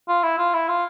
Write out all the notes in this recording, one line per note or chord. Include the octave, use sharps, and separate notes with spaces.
F4
E4
F4
E4
F4